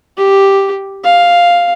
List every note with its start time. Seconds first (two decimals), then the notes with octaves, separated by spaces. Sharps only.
0.17 G4
1.04 F5